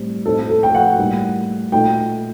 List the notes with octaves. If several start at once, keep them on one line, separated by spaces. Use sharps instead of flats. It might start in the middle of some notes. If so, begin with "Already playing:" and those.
Already playing: A2 G3 C4
A2 A3 C4 D#4 A4
A4
G5
F#5
A2 G3 A#3 D#4
A#2 A3 D#4 G5